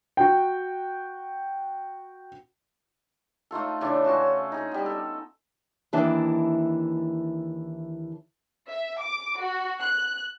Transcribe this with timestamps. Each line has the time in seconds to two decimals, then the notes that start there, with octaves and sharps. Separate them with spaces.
0.17 F#4 G5
3.51 A3 D#4 F4 A4
3.81 C#3 E3 D4 A4
4.04 C#4 F4 F#4 A5
4.52 D#4 G#4
4.71 G3 B3
4.86 A4
5.93 D#2 E3 D4 E4 A5
8.69 E5
9.00 D6
9.39 F#4
9.80 F#6